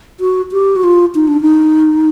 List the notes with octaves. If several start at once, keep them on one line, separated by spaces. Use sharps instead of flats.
F#4
G4
F#4
F4
D#4
D4
D#4